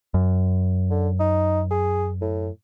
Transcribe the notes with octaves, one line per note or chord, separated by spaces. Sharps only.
F#2
D3
D#4
G#4
A2